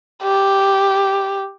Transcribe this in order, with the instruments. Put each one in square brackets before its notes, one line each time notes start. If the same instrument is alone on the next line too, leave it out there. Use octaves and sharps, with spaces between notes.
[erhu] G4